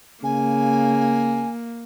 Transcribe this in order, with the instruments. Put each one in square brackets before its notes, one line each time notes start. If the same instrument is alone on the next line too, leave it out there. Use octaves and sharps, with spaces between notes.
[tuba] C#3 [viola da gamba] A#3 [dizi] G#5